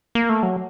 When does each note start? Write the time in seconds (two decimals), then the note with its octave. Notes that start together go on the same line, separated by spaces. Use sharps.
0.15 A#3
0.29 A3
0.43 F#3